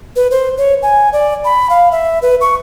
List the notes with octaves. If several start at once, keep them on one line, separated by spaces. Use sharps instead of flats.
B4
C5
C#5
G#5
D5
B5
F5
E5
B4
C#6